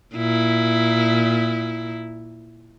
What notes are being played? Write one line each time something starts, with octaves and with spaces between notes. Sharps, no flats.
A#2 E4